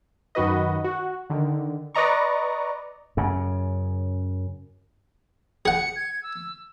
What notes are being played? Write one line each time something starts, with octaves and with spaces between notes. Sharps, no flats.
F#2 D#3 F#4 B4 D#5
F#4
D3 D#3
B4 D5 D#5 A#5 C#6
F#2 C#3
G#4 F#5 C#7
G#6
E6